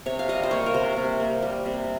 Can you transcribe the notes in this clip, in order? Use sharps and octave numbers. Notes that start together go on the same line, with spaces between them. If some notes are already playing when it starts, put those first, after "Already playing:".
C3 C#5
F5
G3 D#5
C5
A#3 C#5
A#4
C3 C5
C3
A#3
G3
C3